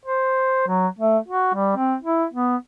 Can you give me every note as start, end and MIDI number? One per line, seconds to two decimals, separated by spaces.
0.06 0.67 72
0.68 0.88 54
0.99 1.18 57
1.28 1.52 66
1.54 1.74 55
1.76 1.95 60
2.02 2.25 64
2.34 2.56 59